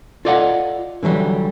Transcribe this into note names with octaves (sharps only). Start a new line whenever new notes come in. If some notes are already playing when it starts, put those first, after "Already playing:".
F4 A4 D5 D#5 F5 F#5
D3 E3 F#3 G3